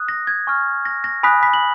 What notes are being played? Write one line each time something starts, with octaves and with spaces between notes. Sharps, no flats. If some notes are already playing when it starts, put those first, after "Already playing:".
Already playing: D#6 F#6
A#6
G#6
G#5 C#6 F6
A#6
A#6
G#5 B5 D#6 F#6 B6
B5 B6
F#7